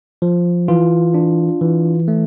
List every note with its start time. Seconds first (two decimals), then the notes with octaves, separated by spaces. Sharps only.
0.22 F3
0.68 E3 F4
1.14 D4
1.61 E3
2.08 A3